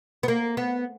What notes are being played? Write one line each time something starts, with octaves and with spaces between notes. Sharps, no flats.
B3
A#3
B3